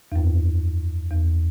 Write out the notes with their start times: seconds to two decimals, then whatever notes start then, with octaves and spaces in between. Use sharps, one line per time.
0.12 E2
0.16 F#2
1.11 E2